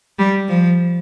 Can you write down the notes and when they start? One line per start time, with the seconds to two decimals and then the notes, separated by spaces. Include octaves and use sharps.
0.19 G3
0.49 F3